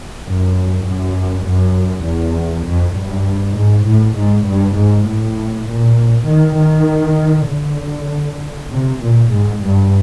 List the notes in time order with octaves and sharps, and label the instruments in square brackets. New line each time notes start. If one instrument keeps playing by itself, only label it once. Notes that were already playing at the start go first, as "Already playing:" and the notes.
[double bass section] F#2
F#2
F#2
E2
F2
G2
G#2
A2
G#2
G2
G#2
A2
A#2
D#3
D#3
D3
C3
A#2
G#2
G2